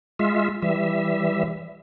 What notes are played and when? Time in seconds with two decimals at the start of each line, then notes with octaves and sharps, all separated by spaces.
0.19 G#3 F4 E5
0.62 E3 G3 E5